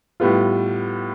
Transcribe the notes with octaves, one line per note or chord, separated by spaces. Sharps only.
A2 G3 B3 F4